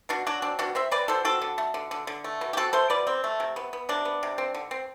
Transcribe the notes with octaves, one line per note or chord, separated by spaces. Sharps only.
B2 D4 F#4
F#3 D4 F#4
C4 D4
B2 D4 F#4
C4 C5 E5
C4 B4 D5
B2 A4 C5
C4 F#4 A4
D3
A3
D3
D3
D3
A3
B2
G4
C4 F#4 A4
A3 A4 C5
B2 B4 D5
C4
A3
C3
B3
B3
C3 D4
B3
C3
C4
D3
C4